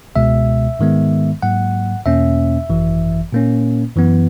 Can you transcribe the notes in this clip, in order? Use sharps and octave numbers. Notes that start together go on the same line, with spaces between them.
C#2 B2 G#3 E5
G#2 D#3 G#3 B3
G#2 F#3 A#3 F#5
E2 B2 A#3 C#4 E5
G#1 F#2 E3
A#2 A#3 C#4
F#2 E3 B3